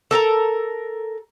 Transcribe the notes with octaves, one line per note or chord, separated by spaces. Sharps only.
A4 A#4 E5 A#5